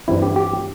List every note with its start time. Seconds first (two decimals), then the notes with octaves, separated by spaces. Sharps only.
0.08 G2 E3 G3 C4 E4
0.22 G4
0.36 G4